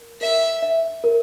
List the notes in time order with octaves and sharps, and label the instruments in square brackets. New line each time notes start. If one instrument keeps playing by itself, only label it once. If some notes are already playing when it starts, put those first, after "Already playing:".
Already playing: [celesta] A#4
[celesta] A#4 [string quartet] E5
[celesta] E5
A#4